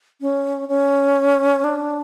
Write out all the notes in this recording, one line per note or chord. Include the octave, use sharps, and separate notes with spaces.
C#4
C#4
D4